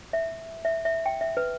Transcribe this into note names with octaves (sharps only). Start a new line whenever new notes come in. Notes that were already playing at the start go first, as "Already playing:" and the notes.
E5
E5
E5
G5
E5
B4